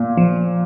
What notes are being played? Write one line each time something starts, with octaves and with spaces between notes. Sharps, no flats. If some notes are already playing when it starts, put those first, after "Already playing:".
Already playing: A#2
F3